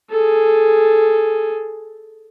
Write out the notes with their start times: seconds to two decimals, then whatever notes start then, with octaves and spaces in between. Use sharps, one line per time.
0.10 G#4 A4